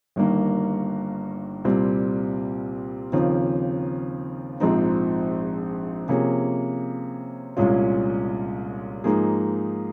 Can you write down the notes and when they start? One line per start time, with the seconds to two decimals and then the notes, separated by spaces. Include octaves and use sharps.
0.16 G1 G2 D#3 A#3
1.65 C2 A#2 G3 C4 F4
3.12 D#2 C#3 F3 C4 D#4
4.60 A#1 G#2 F3 C4 D#4
6.08 C3 F3 A#3 C#4 G#4
7.57 C2 A#2 G#3 C#4 F4
9.04 G#2 F3 A#3 D#4 G#4